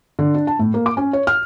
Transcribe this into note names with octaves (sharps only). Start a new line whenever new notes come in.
D3
D4
A5
A2
A#3
D6
C#4
C#5
F6